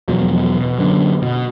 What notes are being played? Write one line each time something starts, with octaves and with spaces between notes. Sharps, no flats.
E2 B2 F3 F#3
B2
F#2 D3
B2